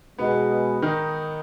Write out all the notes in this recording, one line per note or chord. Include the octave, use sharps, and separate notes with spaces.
B2 G#3 B3 D#4 G#4
D#3 D#4